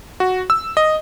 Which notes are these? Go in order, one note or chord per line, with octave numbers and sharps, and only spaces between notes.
F#4
E6
D#5